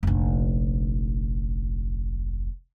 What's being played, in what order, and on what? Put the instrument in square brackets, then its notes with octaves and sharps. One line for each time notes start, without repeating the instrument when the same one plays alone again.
[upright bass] F1 A#1